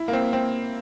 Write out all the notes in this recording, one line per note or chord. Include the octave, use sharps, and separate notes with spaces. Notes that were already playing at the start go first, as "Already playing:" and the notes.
Already playing: E4
A#3
C4
C4